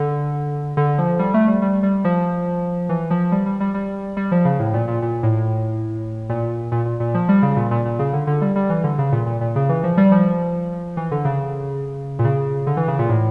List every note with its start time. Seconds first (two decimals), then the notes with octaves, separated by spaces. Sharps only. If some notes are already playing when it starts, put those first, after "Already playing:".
Already playing: D3
0.77 D3
0.98 F3
1.19 G3
1.34 A3
1.48 G3
1.62 G3
1.83 G3
2.04 F3
2.89 E3
3.10 F3
3.32 G3
3.46 G3
3.60 G3
3.74 G3
4.17 G3
4.32 F3
4.45 C#3
4.59 A2
4.74 A#2
4.88 A#2
5.02 A#2
5.23 A2
6.29 A#2
6.72 A#2
6.86 A#2
7.00 A#2
7.14 F3
7.29 G3
7.42 C#3
7.56 A#2
7.71 A#2
7.85 A#2
7.99 C#3
8.13 D3
8.27 D3
8.41 G3
8.56 G3
8.70 E3
8.84 D3
8.98 C#3
9.12 A#2
9.26 A#2
9.41 A#2
9.56 C#3
9.69 E3
9.84 F3
9.97 G3
10.11 F3
10.97 E3
11.11 D3
11.25 C#3
12.19 A#2
12.24 C#3
12.67 D3
12.77 E3
12.88 C#3
12.99 A#2
13.09 A2